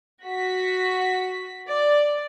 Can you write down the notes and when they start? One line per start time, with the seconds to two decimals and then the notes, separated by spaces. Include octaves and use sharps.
0.24 F#4 B6
1.67 D5